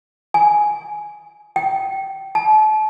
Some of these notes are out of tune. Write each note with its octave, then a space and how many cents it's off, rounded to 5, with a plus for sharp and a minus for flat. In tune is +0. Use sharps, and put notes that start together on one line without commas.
G#5 +5
G5 -20
A5 -35